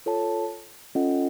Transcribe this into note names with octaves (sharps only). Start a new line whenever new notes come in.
F4 A4 C#5 A5
C#4 F4 A4 D#5 F#5